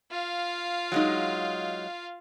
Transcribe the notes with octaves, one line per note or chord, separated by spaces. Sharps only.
F4 F5
F#3 G#3 D#4